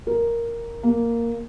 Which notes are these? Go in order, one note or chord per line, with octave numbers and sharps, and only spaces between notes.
A#4
A#3